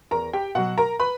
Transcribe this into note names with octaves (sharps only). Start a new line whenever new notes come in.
E2 A#4 A#5
G4 G5
B2 F#3 F#4 F#5
A#4 A#5
B4 B5